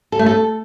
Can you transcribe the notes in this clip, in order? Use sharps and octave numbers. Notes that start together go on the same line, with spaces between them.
A4
A3
A4